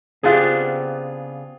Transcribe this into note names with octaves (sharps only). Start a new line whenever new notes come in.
C#3 B3 C4 D4 F4 G4 G#4